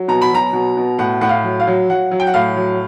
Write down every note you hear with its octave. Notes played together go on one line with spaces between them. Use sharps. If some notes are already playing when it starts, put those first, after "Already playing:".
Already playing: F#3
B2 A#5
B5
F#3 A#5
B2
B2
A2 F#5
A2 F#5
F5
F#3
F5
F#3
F#3 F#5
F#3
G5
F#5
A2 F5
F#3